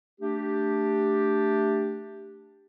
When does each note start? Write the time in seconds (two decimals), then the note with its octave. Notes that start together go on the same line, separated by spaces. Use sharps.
0.21 A3 D4 G4